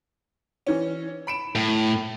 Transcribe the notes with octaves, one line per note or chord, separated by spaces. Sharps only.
E3 C#4
B5 D7 E7
A2